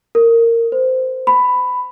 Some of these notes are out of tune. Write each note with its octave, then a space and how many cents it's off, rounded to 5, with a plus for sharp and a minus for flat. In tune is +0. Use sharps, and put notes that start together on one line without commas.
A#4 -15
C5 -20
B5 +10